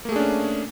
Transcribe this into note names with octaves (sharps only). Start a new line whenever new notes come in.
A3 A#3 C#4 D4 G#4